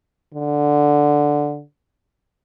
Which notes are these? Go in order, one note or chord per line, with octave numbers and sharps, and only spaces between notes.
D3